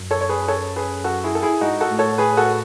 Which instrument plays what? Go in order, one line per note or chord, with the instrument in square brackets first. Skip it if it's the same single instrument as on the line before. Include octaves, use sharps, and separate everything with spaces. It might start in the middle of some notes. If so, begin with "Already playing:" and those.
Already playing: [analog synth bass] F#2
[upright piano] A4 C#5
C#5
G#4 B4
A4 C#5
G#4 B4
F#4 A4
E4 G#4
A4
E4 G#4
[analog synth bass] G#2 [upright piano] D#4 F#4
[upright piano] F#4 A4
[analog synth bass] A2
[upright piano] A4 C#5
G#4 B4
F#4 A4